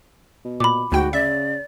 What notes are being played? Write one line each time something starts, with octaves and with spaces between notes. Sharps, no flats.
B2
A#2 B5 D6
D2 G#2 F#4 G5
C#3 D5 E5